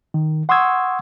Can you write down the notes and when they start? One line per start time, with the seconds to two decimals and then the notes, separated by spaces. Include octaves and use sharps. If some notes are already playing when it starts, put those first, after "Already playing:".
0.14 D#3
0.49 F#5 C6 C#6 D#6 E6 G#6